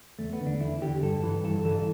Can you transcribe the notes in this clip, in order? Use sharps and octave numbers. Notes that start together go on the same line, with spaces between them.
E2 A3
B3
D3
D4
E2 E4
D3 G4
G2 A4
E3
G2 A4
E3 A4